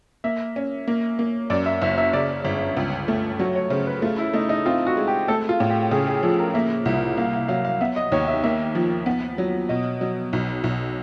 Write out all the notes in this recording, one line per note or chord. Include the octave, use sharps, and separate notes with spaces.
A#3 E5
C#4
A#3
A#3
F#2 D5
E5
F#1 E5
E5
C#3 D5
G1
C#2
A3
F#3 C#5
C#5
C#3 C5
B4
A3 F4
E4
A3 D#4
D#4
C4 F4
F#4
G#3
G4
A3 A4
F4
A2
G4
C#3 G#4
G#4
F3 A4
A#4
A#3 E5
C2 E5
A#3 F5
F5
F#3 F5
F5
B3 E5
D#5
D#2 C#5
E5
A#3 E5
F3
B3
F#3
B2 D#5
F#3
B1
B1